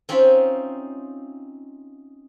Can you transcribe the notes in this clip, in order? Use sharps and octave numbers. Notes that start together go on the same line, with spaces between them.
C4 C#4 D#4 F4 E5 B5